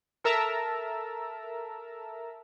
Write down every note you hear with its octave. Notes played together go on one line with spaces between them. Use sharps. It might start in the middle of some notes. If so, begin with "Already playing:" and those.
A4 A#4 E5 A5 A#5 E6